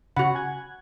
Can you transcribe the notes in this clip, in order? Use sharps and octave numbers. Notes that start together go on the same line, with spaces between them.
C#3 F#4 F#5 B5
G#5 F#6 G#6